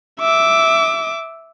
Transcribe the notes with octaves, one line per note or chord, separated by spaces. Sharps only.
E5 D6